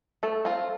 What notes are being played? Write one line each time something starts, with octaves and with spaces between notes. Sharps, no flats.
A3 A4
C4 F4